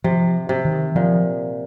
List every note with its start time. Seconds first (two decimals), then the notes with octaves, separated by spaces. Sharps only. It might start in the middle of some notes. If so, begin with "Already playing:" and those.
0.04 C3 F3
0.49 C3
0.65 D#3
0.95 A#2 F3